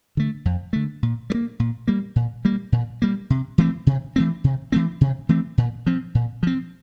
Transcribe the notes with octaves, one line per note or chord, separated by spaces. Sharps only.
D3 A3
F2
D3 A3
A#2
G3
A#3
A#2
G3 A#3
A#2
G3 A#3
A#2
G3 A#3
C3
E3 A3 C4
C3
E3 A3 C4
C3
E3 A3 C4
C3
E3 A3 C4
A#2
F3 C4
A#2
F3 C4